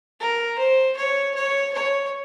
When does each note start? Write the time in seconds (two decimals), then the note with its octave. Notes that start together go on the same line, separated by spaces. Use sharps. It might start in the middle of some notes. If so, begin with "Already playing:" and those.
0.20 A#4
0.58 C5
0.97 C#5
1.35 C#5
1.73 C#5